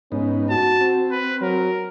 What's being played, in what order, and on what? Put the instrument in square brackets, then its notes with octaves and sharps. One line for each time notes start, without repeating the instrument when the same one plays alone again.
[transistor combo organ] G#2 B3 D#4 [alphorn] C#4
[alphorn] F#4 [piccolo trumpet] A5
[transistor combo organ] C4
[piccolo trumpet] B4
[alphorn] F#3 [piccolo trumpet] A#4